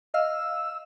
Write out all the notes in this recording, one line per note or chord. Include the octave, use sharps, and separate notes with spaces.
D#5 F5 E6 F6